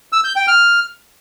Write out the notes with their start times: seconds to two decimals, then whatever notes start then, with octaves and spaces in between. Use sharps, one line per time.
0.12 E6
0.24 G6
0.36 G5
0.48 F6